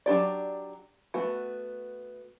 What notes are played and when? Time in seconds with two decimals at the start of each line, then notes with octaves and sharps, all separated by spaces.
0.06 F#3 D4 G4 D5
1.14 A3 B3 F#4